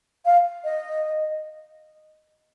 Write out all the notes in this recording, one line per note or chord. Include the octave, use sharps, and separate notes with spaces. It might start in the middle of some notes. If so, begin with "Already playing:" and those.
F5
D#5